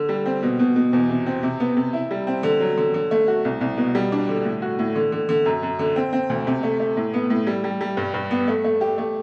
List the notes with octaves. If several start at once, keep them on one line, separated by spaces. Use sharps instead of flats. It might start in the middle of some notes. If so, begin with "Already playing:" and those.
Already playing: D3
G3
C4
B2
B2
B2
E2
C3
C4
C3
B3
C3
E4
G3
C4
D3
F#3
D3
D3
A3
F#4
C2
C2
B2
G3
D4
D3
A2
F#4
A2
D3
D3
D3
F#2
F#2
D3
C4
C4
D2
C3
A3
A3
A2
B3
A2
G3
G3
G3
G2
G2
B3
A3
A3
G4
A3